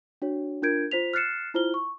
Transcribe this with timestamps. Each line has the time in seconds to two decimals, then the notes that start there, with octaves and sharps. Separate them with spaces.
0.22 D4 F#4 C#5
0.62 D4 F4 A#4 G6 G#6 D7
0.91 F4 C5 B6 F7
1.14 F6 F#6 A6 C7 C#7 E7
1.54 E4 F4 C5 F6 G7
1.74 C#6